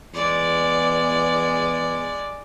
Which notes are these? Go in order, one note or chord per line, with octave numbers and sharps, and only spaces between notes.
E2 G#3 D5